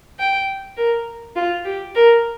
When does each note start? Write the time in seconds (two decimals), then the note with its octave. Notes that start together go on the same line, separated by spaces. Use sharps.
0.19 G5
0.77 A#4
1.36 F4
1.65 G4
1.95 A#4